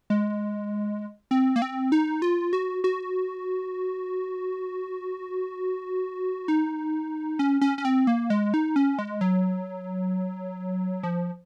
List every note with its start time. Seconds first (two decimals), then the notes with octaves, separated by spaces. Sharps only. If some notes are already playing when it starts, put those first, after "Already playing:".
0.10 G#3
1.31 C4
1.56 A#3
1.62 C4
1.92 D#4
2.22 F4
2.53 F#4
2.84 F#4
6.48 D#4
7.39 C#4
7.61 C#4
7.78 C#4
7.85 C4
8.07 A#3
8.30 G#3
8.54 D#4
8.76 C#4
8.99 G#3
9.21 F#3
11.03 F3